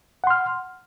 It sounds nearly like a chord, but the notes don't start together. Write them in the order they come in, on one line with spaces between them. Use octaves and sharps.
F#5 C6 F6